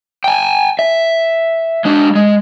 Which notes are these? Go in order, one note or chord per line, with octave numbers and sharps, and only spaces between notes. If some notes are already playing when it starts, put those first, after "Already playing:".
G5 G#5
E5
G#3 D4
G#3